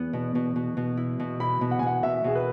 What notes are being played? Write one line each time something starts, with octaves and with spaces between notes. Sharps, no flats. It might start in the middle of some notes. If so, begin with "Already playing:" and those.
Already playing: E2 B3
B2
B2
B2
B2
E4
B2
E4 B5
B2
F#5
G#5
B2 F#5
B2 E5
B2 G#4
B4